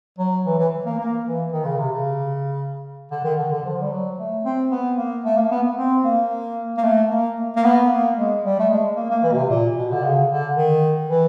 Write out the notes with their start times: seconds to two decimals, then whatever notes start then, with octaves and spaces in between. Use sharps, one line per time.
0.19 F#3
0.46 E3
0.59 E3
0.86 A#3
0.99 A#3
1.25 E3
1.52 D#3
1.65 C#3
1.78 C3
1.92 C#3
3.11 D3
3.24 D#3
3.39 D3
3.52 D3
3.65 F3
3.81 G3
3.92 F#3
4.18 A3
4.45 C4
4.71 B3
4.97 A#3
5.24 A3
5.37 A#3
5.51 B3
5.77 C4
6.04 A#3
6.77 A#3
6.84 A3
7.10 A#3
7.56 A#3
7.64 B3
7.90 A#3
8.17 G#3
8.44 G3
8.59 A3
8.70 G#3
8.96 A#3
9.11 A#3
9.23 E3
9.32 B2
9.37 C3
9.50 A#2
9.76 B2
9.93 D3
10.03 C#3
10.29 D3
10.57 D#3
11.09 E3